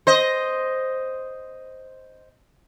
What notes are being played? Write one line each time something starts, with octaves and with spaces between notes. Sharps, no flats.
C5 D#5